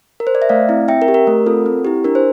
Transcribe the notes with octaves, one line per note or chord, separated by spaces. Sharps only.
A#4
C5
D5
E5
A3 D5 F5
C4 E4
C4 E5 G5
A#4
G4
A#4
A3
C4 F4 A4
C4
E4 G4
D4 A#4
C5